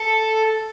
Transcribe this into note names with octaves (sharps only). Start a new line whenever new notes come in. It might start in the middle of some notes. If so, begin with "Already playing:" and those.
Already playing: A4